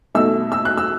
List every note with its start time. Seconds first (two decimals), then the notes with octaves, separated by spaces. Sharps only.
0.15 B2 A3 D#4 E6
0.52 E6
0.65 F#6
0.77 E6